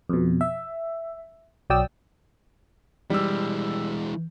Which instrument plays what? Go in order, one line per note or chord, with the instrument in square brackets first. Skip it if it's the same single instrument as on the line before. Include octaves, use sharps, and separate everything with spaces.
[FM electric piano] F2 B2
E5
B1 F#3 D5 G5 D#6 E6
[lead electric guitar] E3 G#3 [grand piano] G3 E6